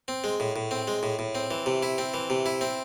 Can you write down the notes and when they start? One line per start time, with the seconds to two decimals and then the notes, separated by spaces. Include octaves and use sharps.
0.08 C4
0.24 G#3
0.40 A2
0.56 A2
0.71 C4
0.88 G#3
1.03 A2
1.19 A2
1.35 C4
1.51 E3
1.66 C3
1.83 E4
1.98 C4
2.14 E3
2.30 C3
2.46 E4
2.61 C4